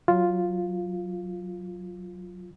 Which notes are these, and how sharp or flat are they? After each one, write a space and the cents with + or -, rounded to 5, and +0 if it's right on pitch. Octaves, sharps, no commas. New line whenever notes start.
F#3 +0 F4 +0